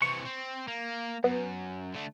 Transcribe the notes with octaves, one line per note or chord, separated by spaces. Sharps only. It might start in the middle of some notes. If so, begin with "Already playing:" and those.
C3 E3 C#6
C4
A#3
F#2 B3
D3 A3